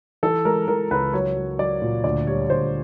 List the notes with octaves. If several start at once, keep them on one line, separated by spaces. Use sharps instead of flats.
E3 A4
G#3 A#4
E3 A#4
C#2 B4
F#3 C#5
F#3
F#3 D5
A#2
D2 D5
G3 C#5
D2 C5